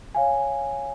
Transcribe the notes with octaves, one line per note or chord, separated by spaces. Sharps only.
C#5 F5 G#5